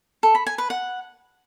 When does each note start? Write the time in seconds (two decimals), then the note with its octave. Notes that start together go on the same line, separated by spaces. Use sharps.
0.23 A4
0.35 B5
0.47 G#5
0.58 B4
0.70 F#5